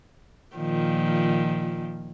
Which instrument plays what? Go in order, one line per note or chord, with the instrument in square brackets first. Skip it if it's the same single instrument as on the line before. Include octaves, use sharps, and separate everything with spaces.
[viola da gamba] A#2 D#3 F3